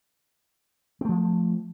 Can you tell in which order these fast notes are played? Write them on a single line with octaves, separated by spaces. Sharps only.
C4 A3 F3